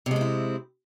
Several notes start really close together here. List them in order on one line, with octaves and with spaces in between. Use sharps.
C3 G#3 C4 E4